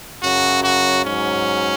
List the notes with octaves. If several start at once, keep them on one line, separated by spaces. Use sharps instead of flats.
F#2 C#3 F#3 F#4
F#4
G#2 F#3 C#4